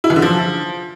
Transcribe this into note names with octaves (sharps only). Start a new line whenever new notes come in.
E4
E3
D3
F3